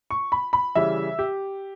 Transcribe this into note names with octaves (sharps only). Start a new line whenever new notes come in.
C#6
B5
B5
C#3 E3 G3 E5
G4